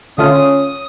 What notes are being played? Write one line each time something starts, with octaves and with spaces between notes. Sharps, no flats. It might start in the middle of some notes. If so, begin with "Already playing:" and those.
D3 A3 C#4 F4 D#6